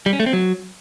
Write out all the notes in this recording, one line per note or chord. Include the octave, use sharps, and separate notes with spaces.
G3
C#4
A3
C4
F#3